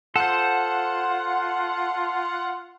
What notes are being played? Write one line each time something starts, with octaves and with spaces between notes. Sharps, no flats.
F4 A4 C5 F#5